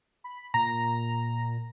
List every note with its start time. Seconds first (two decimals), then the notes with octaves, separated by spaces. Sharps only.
0.24 B5
0.54 A#2 A#5